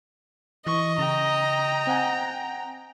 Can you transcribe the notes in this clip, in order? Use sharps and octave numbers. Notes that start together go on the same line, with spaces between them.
E3 D#5 C#6
C#3 G5 A#5
C4 F#5 G#5